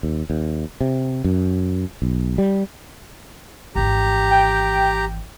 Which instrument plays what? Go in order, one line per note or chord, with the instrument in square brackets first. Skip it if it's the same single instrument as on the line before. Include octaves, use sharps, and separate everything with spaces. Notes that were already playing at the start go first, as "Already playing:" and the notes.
[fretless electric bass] D#2
D#2
C3
F#2
B1
G3
[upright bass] G#1 E3 [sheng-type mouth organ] G4 A#5
[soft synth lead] G5